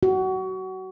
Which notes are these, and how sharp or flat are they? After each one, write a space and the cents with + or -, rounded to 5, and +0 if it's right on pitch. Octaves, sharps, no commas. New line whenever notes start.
F#4 +25